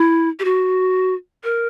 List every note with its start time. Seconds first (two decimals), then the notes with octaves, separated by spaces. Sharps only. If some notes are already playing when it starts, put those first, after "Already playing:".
Already playing: E4
0.39 G4
0.44 F#4
1.44 A#4